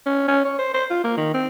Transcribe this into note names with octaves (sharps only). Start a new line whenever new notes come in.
C#4
C#4
C#5
C5
C5
F4
A#3
D#3
C4